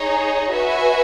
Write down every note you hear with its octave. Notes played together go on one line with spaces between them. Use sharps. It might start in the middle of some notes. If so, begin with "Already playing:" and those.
Already playing: D#4 G#4 C#5
F#4 B4 E5 G#5